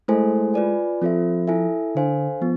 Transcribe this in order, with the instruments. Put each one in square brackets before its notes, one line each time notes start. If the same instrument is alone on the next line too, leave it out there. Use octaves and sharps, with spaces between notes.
[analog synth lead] G#3 [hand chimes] A3 E4 A4 C5 G#5
[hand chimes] F4 B4 D5 G#5
[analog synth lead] F3 [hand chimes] C4 F4 A4 C5 E5
[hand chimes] E4 A4 E5 G#5
[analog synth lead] D3 [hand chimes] D4 A4 C5 F5 G#5
[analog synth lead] F3 [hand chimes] B3